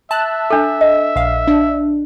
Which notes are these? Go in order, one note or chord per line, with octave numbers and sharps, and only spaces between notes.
E5 A5 F#6
D4 A4
D#5
A#1 F5
D4